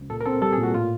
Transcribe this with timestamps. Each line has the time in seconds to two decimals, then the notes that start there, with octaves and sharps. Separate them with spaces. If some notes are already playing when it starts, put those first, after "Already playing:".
Already playing: C#2
0.10 A#2 A4
0.21 A#4
0.26 C4 A4
0.42 G3 A4
0.53 G#4
0.58 A#2
0.63 F#4
0.74 A2 F4